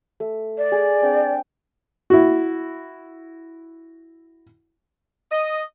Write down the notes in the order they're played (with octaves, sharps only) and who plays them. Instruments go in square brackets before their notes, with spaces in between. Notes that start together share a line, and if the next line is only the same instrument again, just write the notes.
[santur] A3
[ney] D5
[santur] G#4
C4 D4 G5
[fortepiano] E4 F#4
[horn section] D#5